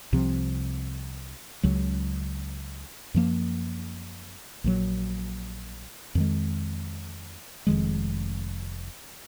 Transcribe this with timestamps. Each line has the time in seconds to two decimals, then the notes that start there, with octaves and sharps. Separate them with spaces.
0.12 C2 C3 F3 C4
1.63 C#2 C#3 F#3
3.14 F#2 F3 A#3
4.64 A#1 A#2 F#3
6.15 F2 D#3 G#3
7.67 F1 F2 D#3 G#3